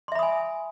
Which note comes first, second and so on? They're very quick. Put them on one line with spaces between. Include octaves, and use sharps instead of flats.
C6 E5 B5 D#6 G#5